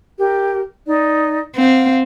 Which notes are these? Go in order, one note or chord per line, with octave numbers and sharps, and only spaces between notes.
G4 A#4
D#4 D5
C4 F5 F#5